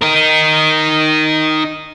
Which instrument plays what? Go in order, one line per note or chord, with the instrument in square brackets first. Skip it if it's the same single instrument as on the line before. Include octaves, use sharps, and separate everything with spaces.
[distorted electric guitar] D#4 A#4